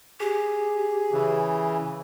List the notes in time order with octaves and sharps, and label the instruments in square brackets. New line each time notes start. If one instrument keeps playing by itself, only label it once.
[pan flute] G4 [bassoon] G#4
[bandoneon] C#3 E3